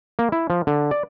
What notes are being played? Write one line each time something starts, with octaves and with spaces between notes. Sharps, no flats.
A#3
E4
F3
D3
D5